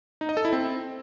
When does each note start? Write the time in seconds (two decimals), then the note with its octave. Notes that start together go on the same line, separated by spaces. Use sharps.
0.21 D#4
0.29 D#5
0.37 A4
0.45 E4
0.53 C4